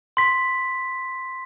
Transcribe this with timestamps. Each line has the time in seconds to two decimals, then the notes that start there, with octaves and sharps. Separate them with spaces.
0.17 C6 B6